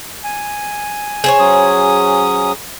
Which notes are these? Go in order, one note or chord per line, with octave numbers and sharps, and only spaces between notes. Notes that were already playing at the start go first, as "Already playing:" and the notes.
G#5
G#4 C5 C#5
F#3 C#4 D#6